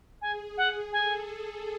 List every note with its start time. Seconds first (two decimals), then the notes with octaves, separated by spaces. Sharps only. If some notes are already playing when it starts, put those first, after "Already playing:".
0.22 G#4 G#5
0.58 F#5
0.92 A4 G#5